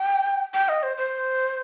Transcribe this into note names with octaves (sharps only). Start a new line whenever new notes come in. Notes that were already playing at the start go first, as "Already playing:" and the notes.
Already playing: G5
G5
D#5
C5
C5